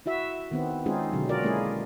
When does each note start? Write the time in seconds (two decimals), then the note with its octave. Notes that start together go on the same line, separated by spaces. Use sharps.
0.06 E4 F#4 E5
0.51 D#3 B3 C4
0.86 G#3 C4 C#4 D#4 F4 G#4
1.12 B2 D3 F#3
1.29 F4 F#4 G#4 A#4 D5
1.42 G#3 A#3 C#4 E4 G#4